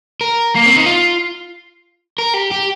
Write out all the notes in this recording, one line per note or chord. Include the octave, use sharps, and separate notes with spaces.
A#4
A#3
C4
D#4
F4
A#4
G4
G4